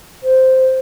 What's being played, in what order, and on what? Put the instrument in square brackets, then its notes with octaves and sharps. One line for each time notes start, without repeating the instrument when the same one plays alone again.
[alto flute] C5